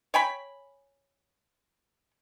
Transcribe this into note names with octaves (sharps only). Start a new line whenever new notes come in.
C#5 G5 G#5 B5